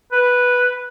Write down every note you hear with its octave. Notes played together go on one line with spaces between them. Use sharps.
B4